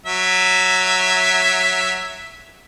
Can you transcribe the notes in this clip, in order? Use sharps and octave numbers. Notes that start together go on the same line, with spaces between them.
F#3 E5